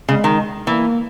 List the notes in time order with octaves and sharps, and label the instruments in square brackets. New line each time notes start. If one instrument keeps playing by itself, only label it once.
[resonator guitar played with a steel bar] C#3 [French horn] G#3
[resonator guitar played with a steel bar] D#3
[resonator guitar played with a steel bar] E3 [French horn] A#3